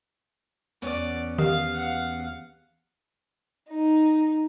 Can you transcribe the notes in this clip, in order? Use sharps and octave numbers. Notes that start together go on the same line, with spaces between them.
E2 B3 C#4 D5
D#3 G4 F5
F5 F#5
D#4